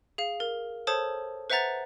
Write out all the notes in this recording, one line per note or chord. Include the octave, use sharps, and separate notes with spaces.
G#4 F5
A#4
A4 C5 C#5 A5 D#6
B4 C5 E5 F#5 A#5 A6